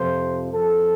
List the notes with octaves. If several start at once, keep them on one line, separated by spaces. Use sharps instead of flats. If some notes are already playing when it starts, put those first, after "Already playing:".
Already playing: F2 C3 F3 C5
F2 F3 A4